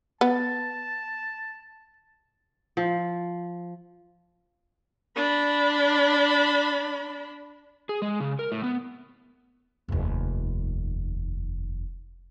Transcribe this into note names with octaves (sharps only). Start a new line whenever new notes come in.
B3 A5
F3
D4 B5
G#4
G#3
C#3
A#4
A2
B3
F1 D#2